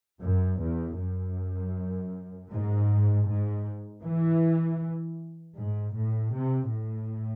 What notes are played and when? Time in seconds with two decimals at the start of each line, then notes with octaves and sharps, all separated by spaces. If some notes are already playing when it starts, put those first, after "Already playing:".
0.22 F#2
0.60 E2
0.99 F#2
2.51 G#2
3.28 G#2
4.04 E3
5.57 G#2
5.95 A2
6.34 C3
6.72 A2